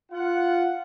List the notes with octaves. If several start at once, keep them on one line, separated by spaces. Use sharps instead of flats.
F4 F#5